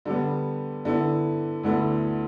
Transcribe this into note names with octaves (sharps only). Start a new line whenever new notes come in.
D3 G3 B3
D3 B3 E4
D2 D3 B3 E4